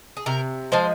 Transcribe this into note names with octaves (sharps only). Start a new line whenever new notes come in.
G#4
C3 A#4
F3 G#3 C5